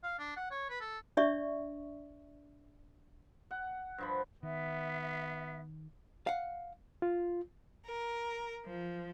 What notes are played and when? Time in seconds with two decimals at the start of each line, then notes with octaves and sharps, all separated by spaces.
0.03 F5
0.19 D4
0.37 F#5
0.51 C#5
0.69 B4
0.81 A4
1.17 D4 D5 E5 C#6
3.51 F#5
3.98 G2 F3 B5
4.43 D#3 B3 E5
6.27 F5 F#5
7.02 F4
7.86 A#4
8.66 F3